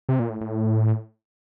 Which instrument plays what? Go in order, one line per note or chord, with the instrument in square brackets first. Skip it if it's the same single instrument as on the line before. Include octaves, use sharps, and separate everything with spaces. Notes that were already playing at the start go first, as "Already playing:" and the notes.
[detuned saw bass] C3
A#2
A2
A2